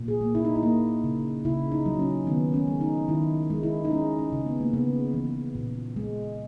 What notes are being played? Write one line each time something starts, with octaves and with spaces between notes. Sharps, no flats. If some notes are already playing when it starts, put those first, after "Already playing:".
Already playing: A#2
G#4
A#3
E4
D#4
E4
A#3
C#3
C#3 E4
D#4
F#3
C#4
D#3 B3
C#4
G#3
D#4
D#3 E4
G#3
E4
D#4
G#3 C#4
C#4
C#3
B3
A#3
C#3 B3
E3
A#2
G#3